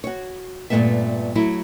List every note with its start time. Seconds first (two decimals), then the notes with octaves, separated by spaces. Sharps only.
0.04 F#4 C#5
0.70 G2 A#2 D#3 A3 B3 E5
1.35 F#3 A3 E4